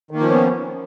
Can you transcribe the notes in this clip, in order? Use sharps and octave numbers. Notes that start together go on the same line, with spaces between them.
D#3 F3 A#3 B3 C#4